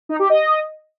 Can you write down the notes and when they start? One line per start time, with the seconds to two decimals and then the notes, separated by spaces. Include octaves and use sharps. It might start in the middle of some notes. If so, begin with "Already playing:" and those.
0.09 D#4
0.19 G4
0.30 D#5